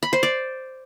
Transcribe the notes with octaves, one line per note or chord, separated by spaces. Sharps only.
B5
C5
D5